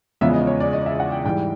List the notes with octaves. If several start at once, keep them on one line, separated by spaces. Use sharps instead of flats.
E2 C#3 F3 G#3 B3 E5
D#5
C#5
D5
D#5
E5
F#5
G5
G#2 E3 G3 G5